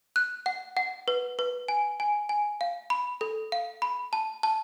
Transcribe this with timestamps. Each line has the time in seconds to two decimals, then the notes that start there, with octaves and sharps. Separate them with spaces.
0.16 F#6
0.46 F#5
0.77 F#5
1.08 B4
1.39 B4
1.68 G#5
2.00 G#5
2.29 G#5
2.61 F5
2.90 B5
3.21 A4
3.52 F5
3.82 B5
4.13 A5
4.43 A5